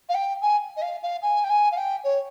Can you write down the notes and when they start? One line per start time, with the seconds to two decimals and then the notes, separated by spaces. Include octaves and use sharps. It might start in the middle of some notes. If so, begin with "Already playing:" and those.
0.09 F5
0.15 G5
0.42 G#5
0.77 D#5
0.82 F5
1.03 F5
1.22 G#5
1.44 G5
1.50 G#5
1.72 F5
1.77 G5
2.04 C#5